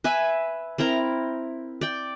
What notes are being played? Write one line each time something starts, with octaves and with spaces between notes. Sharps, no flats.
B4 E5 G#5
C4 E4 A#4 A#5
D5 G5